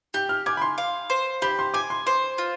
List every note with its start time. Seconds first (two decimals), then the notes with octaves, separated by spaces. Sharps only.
0.14 G4 G6
0.29 F6
0.46 G#5 D6
0.57 B5
0.62 C6
0.78 F5
1.10 C5
1.42 G4 B5
1.59 C6
1.74 G#5 D6
1.90 C6
2.06 C5 C6
2.38 F4